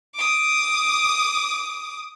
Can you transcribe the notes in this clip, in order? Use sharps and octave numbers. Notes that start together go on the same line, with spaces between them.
D6 D#6